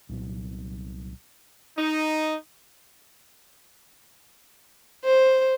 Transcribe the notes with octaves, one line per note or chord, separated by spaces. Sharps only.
C2 A#2 F#3
D#4
C5